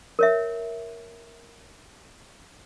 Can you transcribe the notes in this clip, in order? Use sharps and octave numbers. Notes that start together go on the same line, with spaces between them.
A#4 C#5 E5